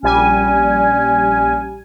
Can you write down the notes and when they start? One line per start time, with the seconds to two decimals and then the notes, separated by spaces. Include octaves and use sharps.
0.03 A#1 G3 C#4 G#5